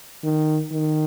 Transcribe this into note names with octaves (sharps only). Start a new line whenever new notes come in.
D#3
D#3